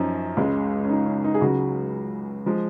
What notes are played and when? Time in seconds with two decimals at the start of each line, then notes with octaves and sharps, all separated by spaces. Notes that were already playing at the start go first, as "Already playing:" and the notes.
Already playing: F#2 F3 C#4 D#4
0.37 C#2 C#3 G#3
0.84 C#4
0.89 D#4
1.06 C#4
1.24 D#4
1.34 G#4
1.41 C#2 C#3 F#3 F#4
2.46 F3 G#3